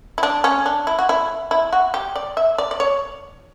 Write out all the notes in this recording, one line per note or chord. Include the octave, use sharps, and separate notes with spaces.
E4
D4
C#4
D4
E4
F#4
E4
E4
F#4
G4
D5
E5
D5
D5
C#5